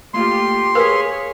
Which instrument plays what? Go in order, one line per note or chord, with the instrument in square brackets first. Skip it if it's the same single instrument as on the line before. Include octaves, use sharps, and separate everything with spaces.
[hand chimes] A3 A#3 [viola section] F4 G4 [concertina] C6
[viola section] G#4 C#5 [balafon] A#4 B4 [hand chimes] F5 G#5 B6